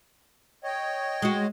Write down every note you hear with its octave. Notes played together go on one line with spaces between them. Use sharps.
C#5 D#5 G5
G#3 F#4